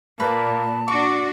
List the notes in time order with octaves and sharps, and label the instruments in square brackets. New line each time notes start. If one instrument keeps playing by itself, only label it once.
[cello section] A#2 [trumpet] A#3 [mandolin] B4 D5 [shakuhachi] A5
[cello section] D4 F#4 [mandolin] C#6 [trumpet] D6